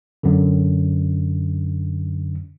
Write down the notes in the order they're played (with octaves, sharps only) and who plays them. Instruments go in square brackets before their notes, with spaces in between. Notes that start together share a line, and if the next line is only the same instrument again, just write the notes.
[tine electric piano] F#2 D3